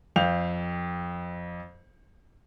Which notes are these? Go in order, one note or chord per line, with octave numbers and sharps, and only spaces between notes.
F2 F5 G6 F7